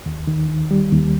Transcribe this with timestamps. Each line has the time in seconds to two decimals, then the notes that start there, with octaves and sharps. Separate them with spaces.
0.06 D#2
0.27 D#3
0.49 D#3
0.71 G3
0.92 D#2